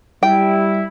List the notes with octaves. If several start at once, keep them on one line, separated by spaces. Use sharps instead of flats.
G3 E4 G5